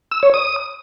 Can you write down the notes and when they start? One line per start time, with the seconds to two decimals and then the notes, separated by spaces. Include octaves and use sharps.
0.11 E6
0.23 C#5
0.34 D#6